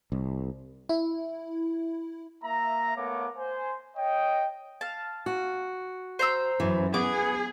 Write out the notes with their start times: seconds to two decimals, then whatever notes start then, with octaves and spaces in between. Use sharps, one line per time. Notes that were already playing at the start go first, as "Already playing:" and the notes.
0.12 C2
0.89 E4
2.43 A#3 E5 A#5
2.96 A3 B3 A#4 C#5 F5 D6
3.37 C5 G#5
3.97 C#5 D#5 G5
4.81 F5 A5
5.26 F#4
6.19 C5 A#5 E6
6.60 F#2 E3
6.94 B3 G#4 D6